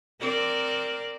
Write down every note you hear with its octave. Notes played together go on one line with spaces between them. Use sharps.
C4 A#4 D5